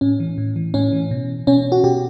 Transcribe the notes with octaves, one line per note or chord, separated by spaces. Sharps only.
A2 C#4
E3
A2
E3
A2 C#4
E3
B2
B2 C#4
F#4
B2 G4